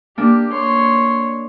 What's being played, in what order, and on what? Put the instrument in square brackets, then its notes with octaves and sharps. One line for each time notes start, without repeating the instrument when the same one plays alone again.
[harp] A#3 D4 [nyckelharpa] G4
[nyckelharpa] C#5 C6